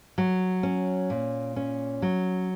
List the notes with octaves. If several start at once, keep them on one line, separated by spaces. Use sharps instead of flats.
F#3
C#4
A#2
C#4
F#3